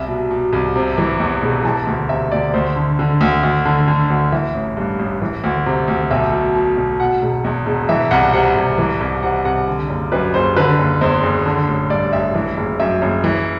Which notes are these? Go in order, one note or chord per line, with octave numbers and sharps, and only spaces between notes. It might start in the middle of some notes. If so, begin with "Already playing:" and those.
Already playing: C2 E5
B2
B2
C2
C3
E3
E2
E1
E3 A5
D2
C3 E5
D2 D5
D2 C5
D3
D3
D2
D2
D3
D3
D2
E3 E5
A1
G2
A1
E3
D2
C3
D2
B1 E5
B2
B2
B1
B2 F#5
E1
E2
E1
E3 E5
C2 F#5
C3 F#5
C2
E3
C2
C3 F#5
C2 F#5
D3
F#1
F#2 B4
F#1 C5
D3 B4
F#1
E2 C5
F#1
D3
A1
G2 D5
A1 E5
E3
F#1
F#2 E5
F#1
E3